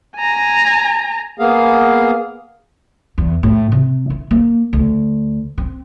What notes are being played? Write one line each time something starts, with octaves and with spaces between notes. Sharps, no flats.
G#5 A#5
A#3 B3 G#4 F5
E2
A2
C3
E4
A#3
D2
C4